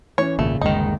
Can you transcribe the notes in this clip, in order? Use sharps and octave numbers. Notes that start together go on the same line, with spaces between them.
E3 C#4 C#5
G#1 A#2 C#3 A3
G1 D#2 D#3 G#3 D#4